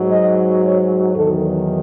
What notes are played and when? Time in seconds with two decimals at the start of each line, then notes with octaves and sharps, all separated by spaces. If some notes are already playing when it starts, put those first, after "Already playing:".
Already playing: G#2 F#3
0.10 D#5
0.63 C#5
1.14 E2 D#3 F#3 A4